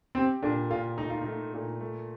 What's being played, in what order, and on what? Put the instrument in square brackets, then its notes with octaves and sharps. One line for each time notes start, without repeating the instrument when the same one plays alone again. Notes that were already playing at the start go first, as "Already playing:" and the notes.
[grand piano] C4 [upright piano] G4
[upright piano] A#2 [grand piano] D4
[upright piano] A#2 [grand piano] F4
[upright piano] A3 [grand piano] D#4
[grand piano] F4
[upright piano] A3 [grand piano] D#4
[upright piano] A#2
A3